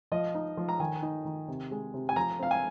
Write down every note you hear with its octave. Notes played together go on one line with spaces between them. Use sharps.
F3 D#5
D#4
F3
A#5
D#3 G#5
D#4
D#3
C3
G#3
C3
G#5
F3 A#5
C4 F5
G#5